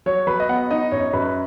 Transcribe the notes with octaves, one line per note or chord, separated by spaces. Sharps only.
F#3 C#5
F#3 B4
D#5
B3 F#5
D#4 D#5
F#2 C#5
F#2 B4